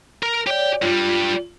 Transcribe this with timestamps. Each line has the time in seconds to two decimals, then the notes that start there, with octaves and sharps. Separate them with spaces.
0.23 A#4
0.47 G4 C#5 D5 G5
0.82 G2 G3 F4